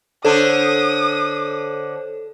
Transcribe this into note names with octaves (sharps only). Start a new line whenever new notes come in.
D3 D4 A4 C5 C#5 D#6